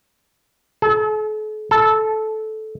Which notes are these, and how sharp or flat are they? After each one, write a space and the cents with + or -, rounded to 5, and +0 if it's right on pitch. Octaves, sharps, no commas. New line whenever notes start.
A4 -45
A4 -15